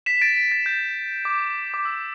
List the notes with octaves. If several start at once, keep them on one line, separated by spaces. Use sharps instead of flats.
B6 E7
A6 D7
B6
A6
G6
D6
D6
E6